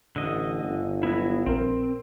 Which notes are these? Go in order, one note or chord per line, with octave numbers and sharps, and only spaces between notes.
A1 D3 D#5
G1
F#3 B3 E4
A#1 C4 A#4